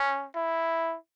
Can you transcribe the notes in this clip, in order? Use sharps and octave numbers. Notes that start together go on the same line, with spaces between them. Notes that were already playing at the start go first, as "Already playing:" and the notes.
Already playing: C#4
E4